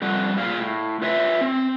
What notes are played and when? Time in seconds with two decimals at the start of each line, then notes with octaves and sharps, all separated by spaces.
0.02 F2 G3 A4 F#5
0.37 A#2 G#4 D5 F5
0.59 A2
1.02 F4 B4 C#5 E5 G#5
1.41 C4